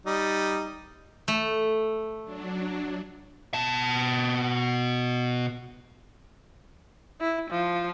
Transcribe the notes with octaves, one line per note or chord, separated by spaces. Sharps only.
G3 D#4
A3
F#3 D4
B2 A5
E4
F3